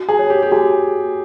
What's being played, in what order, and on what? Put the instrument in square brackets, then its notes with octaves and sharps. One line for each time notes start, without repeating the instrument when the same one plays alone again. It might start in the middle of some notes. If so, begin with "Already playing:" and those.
Already playing: [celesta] F#4
[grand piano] G#4
[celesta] C#5
[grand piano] G4
G4
[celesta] F#4 [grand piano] G#4